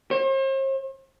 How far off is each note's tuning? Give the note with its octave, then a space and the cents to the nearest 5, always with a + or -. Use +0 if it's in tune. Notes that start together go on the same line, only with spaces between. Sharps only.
C5 +45